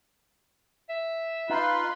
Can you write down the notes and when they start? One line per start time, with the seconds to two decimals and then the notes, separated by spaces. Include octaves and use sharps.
0.89 E5
1.50 D#4 F4 B4 B5 C6